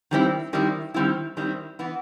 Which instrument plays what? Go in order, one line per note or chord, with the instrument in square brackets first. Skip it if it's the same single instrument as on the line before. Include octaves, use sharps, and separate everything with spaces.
[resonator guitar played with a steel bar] D#3 G3 C4 E4
D#3 G3 C4 E4
D#3 G3 C4 E4
D#3 G3 C4 E4
E3 B3 E4